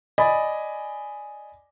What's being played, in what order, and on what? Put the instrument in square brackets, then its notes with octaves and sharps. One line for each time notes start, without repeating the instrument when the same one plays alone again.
[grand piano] D5 D#5 G#5 B5